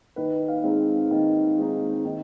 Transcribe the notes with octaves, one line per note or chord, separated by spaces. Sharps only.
D#3 B4
F5
G#3 C4 D#4
D#3
G#3 C4 D#4
D#3